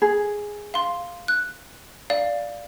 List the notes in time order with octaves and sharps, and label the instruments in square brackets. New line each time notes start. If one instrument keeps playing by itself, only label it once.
[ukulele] G#4
[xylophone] F5 C6
F#6
D5 F5